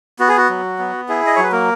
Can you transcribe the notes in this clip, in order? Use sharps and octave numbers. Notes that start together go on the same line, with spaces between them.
B3 F#4
G#4
F#4
F#3
B3
E4 G#4
D#5
F#3 C#5
B4
A#3 A#4